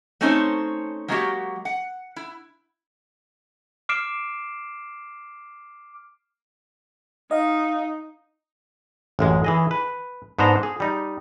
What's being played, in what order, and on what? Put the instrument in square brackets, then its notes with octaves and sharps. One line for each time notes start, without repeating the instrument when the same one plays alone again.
[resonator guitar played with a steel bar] A3 C4 C#4 D#4 C5 C#5
F#3 G#3 A#3 D#4 F#4 G4
F#5
E4
[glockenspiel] D6 F6 C7 D7 E7
[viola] D#4 [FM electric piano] D#5 F5
[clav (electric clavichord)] A1 F#2 G#3
E3 G#4 D#5
B4
G#2 B3 D4 C5 A#5
G#4
G3 D#4